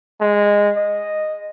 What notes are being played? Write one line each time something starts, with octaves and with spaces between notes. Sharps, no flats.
G#3
D#5